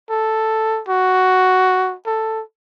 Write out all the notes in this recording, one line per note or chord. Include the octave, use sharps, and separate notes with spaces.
A4
F#4
A4